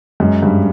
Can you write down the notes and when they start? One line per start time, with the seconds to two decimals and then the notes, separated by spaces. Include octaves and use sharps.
0.20 F#2 G#3
0.43 G2